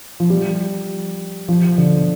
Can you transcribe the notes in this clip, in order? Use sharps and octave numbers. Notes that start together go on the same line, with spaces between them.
F3
G3
F3
D3